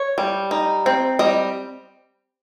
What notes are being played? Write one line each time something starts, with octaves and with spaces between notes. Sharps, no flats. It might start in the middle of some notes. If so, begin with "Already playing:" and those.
Already playing: C#5
G3
D#4
C4
G3 D#5